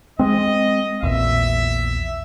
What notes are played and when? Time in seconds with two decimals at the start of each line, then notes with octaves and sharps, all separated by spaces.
0.19 G#3 C4 D#5
1.03 A#1 E2 A#2 E5